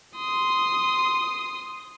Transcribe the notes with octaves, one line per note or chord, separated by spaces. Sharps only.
C6 D#6